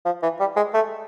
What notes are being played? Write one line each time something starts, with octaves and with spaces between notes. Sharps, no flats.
F3
E3
G3
G#3
A3